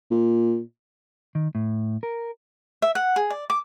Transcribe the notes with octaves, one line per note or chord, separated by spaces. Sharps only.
A#2
D#3
A2
A#4
E5
F#5
G#4
D5
D6